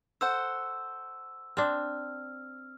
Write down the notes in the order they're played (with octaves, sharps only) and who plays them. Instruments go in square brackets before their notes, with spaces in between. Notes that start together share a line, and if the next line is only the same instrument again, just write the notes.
[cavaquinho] A4 C5 F#5 [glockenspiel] E6
[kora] C4 D4 [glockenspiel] F6